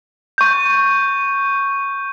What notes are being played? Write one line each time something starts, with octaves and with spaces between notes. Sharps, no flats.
C#6 G6